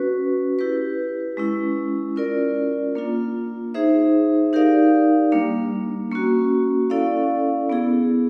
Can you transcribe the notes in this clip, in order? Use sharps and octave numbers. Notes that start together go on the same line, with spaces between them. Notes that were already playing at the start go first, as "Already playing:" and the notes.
Already playing: C#4 F#4 B4
E4 G4 B4
G#3 C#4 E4
C#4 F4 A#4 D5
A#3 D4 F4
D#4 G#4 C5 E5
D#4 G4 A#4 D5 F5
G3 A#3 D4
A#3 C#4 F#4
C#4 E4 A4 D5 F5
B3 E4 G#4